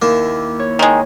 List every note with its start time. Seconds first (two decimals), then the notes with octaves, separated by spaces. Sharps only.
0.02 D#2 A#3 E4
0.59 C#5
0.79 D#3 G#3